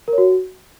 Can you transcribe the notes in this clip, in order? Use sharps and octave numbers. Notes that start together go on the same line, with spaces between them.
A#4
C#5
F#4